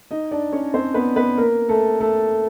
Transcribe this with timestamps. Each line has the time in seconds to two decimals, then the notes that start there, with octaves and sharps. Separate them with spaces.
0.11 D#4 D#5
0.31 D4 D5
0.52 C#4 C#5
0.74 C4 C5
0.94 B3 B4
1.16 B3 B4
1.37 A#3 A#4
1.69 A3 A4
2.00 A3 A4